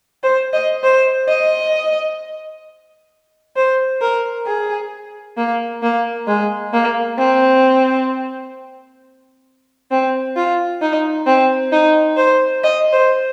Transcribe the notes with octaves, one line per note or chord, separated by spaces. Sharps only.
C5
D#5
C5
D#5
C5
A#4
G#4
A#3
A#3
G#3
A#3
C4
C4
F4
D#4
C4
D#4
C5
D#5
C5